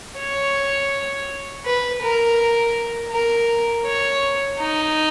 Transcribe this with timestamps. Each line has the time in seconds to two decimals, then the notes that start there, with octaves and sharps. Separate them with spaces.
0.19 C#5
1.66 B4
2.03 A#4
3.13 A#4
3.86 C#5
4.60 D#4